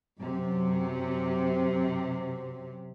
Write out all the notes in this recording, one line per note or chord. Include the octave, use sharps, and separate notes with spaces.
F#2 C3